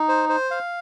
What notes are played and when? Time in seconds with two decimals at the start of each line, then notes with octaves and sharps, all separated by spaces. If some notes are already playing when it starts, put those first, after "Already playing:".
Already playing: D#4
0.09 C5
0.29 C5
0.51 F5